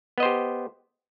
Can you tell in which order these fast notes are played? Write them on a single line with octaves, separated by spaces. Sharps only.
B3 D#5 C5 G4